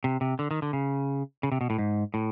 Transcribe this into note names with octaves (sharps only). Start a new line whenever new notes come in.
C3
C3
D3
D#3
D3
C#3
C#3
C3
B2
A2
G#2
A2